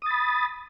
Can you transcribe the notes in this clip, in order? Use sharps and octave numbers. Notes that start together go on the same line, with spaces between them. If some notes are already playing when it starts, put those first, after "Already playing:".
B5 D#6 A6